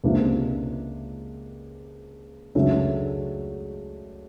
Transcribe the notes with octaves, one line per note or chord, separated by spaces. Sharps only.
C#2 C3 F3 A#3 D4
C#2 C#3 F#3 A3 D4